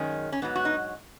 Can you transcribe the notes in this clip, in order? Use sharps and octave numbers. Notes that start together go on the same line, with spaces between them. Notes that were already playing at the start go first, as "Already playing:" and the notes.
Already playing: F#2 D#3 G#3 C#4
C#4
G#2 F#3 B3
F#4
D#4